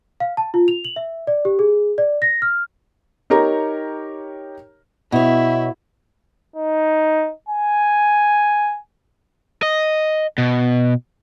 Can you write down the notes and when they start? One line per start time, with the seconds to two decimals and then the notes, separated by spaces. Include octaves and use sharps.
0.20 F5
0.37 A5
0.54 F4
0.68 F7
0.85 F#7
0.96 E5
1.27 D5
1.45 G4
1.59 G#4
1.98 D5
2.22 A#6
2.42 F6
3.30 D#4 G4 A#4 C#5 A#5
5.12 B2 E4 C#5 E5
6.56 D#4
7.49 G#5
9.63 D#5
10.38 B2